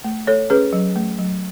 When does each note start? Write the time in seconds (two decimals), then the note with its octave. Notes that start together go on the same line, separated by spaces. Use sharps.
0.04 A3
0.27 A3 A4 C#5
0.50 C#4 G#4 B4
0.73 F#3
0.96 A3
1.18 F#3